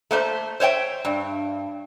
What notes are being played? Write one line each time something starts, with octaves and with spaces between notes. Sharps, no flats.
A3 A#3 C5
C5 C#5 E5 G5
G2